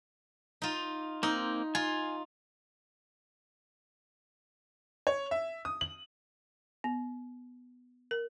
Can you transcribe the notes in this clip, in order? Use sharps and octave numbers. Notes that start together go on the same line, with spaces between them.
D#4 F4
A#3 C4 D#4
F4 G#5
C#5
E5
D#6
F#7
B3
A#4